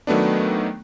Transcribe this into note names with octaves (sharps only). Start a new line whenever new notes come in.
D#3 F#3 A3 B3 D4